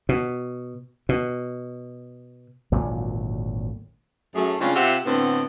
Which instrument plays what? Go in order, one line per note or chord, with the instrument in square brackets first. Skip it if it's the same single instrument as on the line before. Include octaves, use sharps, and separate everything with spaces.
[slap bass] B2
B2
G#1 D2 A#2 F#3
[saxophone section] F#2 A3 G#4
C#3 G#3 C4 D4 F4 F5
C3 F4 C5 E5 F#5
A2 D3 B3 C4